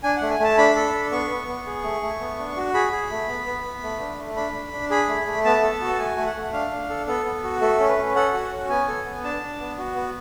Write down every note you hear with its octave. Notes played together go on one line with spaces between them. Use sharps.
D4 G#5
A3 F#5
G#5
A3 A5
D4 B5
A4
D4
B3 C#6
B3
B3
G#4
A3
A3
B3
D4
F#4
G#4 B5
G#4
A3
B3
B3
B3
A3
D4
A3
D4 B5
D4
D4
G#4 B5
A3
A3
B3 A5
A4
F#4
A5
A3 G#5
A3
F#5
A3
D4 F5
D4
A4
B3 A4
B3
F#4
A3 A4
C#4
B4
C#4
A4 F#5
F#4
C#4
B3 G#5
A4
B3
D4 A5
D4
B3
F#4
B3